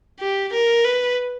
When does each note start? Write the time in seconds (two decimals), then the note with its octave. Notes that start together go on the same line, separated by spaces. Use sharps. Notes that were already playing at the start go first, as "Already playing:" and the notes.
0.20 G4
0.53 A#4
0.85 B4